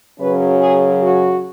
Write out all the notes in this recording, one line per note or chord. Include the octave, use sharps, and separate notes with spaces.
F#2 C#3 F#3 C#4 B4
G#4
F#4